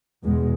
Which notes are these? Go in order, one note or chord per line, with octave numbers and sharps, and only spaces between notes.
E2 B2 G#3